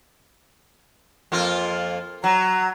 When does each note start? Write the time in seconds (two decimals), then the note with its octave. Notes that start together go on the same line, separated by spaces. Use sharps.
1.32 F2 A#3 F4
2.24 F#3 A#5